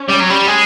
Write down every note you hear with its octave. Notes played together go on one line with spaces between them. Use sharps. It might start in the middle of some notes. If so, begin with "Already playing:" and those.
Already playing: C#4
G3
F#3
G3
G#3